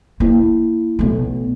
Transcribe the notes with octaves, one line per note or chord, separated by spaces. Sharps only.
A#3 E4
B1 A3